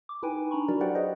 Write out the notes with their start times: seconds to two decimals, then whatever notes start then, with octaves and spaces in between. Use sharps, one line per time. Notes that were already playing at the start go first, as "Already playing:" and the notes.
0.09 D6
0.23 D#4 E4 B4 G5 G#5
0.51 D4 A#5 B5 C#6
0.68 F#3 F#4 A#4 D5
0.81 G4 B4 C5 D5 F#5 G5
0.95 G#4 B4 C5 D#5 F#5